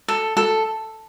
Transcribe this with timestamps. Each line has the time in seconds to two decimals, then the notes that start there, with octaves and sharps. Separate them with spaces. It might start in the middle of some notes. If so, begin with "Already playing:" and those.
0.08 A4
0.37 A4